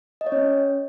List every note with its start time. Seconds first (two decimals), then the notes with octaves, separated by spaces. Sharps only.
0.21 D#5
0.27 C#5
0.32 C#4